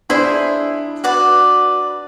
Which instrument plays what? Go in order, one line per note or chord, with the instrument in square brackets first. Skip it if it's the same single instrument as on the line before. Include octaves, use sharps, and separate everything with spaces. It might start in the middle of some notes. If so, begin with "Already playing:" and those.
[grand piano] D4 [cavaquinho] E4 G#4 C5
[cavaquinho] F#4 B4 D5